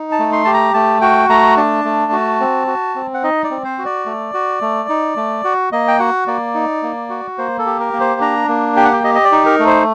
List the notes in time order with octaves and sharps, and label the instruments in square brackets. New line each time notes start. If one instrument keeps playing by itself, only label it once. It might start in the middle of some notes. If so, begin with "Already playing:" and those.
Already playing: [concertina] D#4
A5
A3
C6
G4 A5
A#5
A3 A5
F#4 G5
A3 A#5
D4 A5
A3
F#4
C4
F#4
C4
F#5
D#4 D#5
D5
C4
C5
F#4
D5
A3
F#4
A3
D#4
A3
F#4
A#3 D#5
G5
F#4 F#5
A#3 D5
D#4
A#3
F#4
A#3 C5
A4
G4
A#4
A#3
C5
D4 A#5
A#3
G4 G5
F#5
G5
G4 D#5
D#5
D5
D#4
A#4
A3
C5